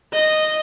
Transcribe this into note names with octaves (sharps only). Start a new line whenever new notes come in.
D#5